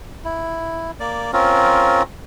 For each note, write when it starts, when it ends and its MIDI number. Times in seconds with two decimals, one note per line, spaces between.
0.25 0.91 64
1.00 1.31 58
1.00 1.31 74
1.33 2.03 60
1.33 2.03 61
1.33 2.03 65
1.33 2.03 70